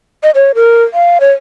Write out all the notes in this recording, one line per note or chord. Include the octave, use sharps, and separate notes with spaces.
D#5
C#5
A#4
F5
C#5